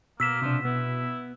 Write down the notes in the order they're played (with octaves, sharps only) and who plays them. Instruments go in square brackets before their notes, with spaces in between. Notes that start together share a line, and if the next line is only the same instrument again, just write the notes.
[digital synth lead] B2 [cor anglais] A#3 [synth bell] E6 B6 E7
[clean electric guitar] C3 D4 [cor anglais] F3
[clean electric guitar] B3 [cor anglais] E4